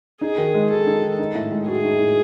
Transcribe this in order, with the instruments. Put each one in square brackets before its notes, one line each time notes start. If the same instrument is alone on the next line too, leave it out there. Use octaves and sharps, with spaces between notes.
[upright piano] D#4 [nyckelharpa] G#4
[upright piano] D#3
G#3
[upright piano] G#4 [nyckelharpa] A4
[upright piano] D#4
D#3
D#4
A2
G#3
[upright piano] F#4 [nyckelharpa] G#4
[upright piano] D#4
A2